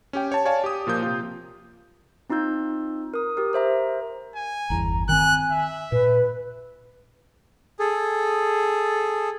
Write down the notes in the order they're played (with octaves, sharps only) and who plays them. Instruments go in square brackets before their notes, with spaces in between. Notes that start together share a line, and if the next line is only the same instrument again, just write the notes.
[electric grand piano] C#4 G4 G5
C#5 A5
C#5 D5 F5 G#5 A5
G4 D#6
A#2 F3 A#3 G6
C3 F4
[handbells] C4 D#4 F4 E6 G6
A#4 D#6
G4 A#4
A#4 C5 E5 A#5
[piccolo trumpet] G#5
[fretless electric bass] G1 E2 [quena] A#5
[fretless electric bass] D#3 C4 [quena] G#5 [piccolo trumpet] F#6
[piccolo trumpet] E5
[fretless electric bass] A#2 [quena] B4
[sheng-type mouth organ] G#4 A4